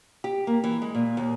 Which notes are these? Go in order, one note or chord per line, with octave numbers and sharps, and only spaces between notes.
G4
A#3
E3
G#3
A#2
D#2